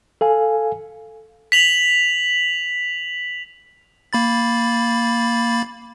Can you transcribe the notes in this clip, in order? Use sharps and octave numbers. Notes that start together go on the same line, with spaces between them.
A4 F5 G#5
B6 F7 F#7
A#3 B5 A6